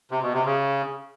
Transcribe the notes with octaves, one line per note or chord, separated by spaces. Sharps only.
C3
B2
C3
C#3